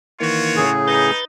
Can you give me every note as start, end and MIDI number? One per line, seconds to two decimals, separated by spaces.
0.20 0.65 51
0.20 0.65 52
0.20 0.65 58
0.20 0.71 65
0.20 0.71 66
0.20 0.71 73
0.56 1.11 45
0.56 1.11 49
0.56 1.11 68
0.88 1.21 63
0.88 1.25 71
0.88 1.25 91
0.88 1.25 93